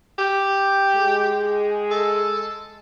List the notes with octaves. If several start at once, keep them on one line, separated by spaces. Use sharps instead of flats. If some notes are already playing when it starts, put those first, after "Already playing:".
G4
G#3 G#4
A4